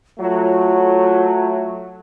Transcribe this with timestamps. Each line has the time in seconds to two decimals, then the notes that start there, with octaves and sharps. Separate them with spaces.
0.19 F#3 A3 F4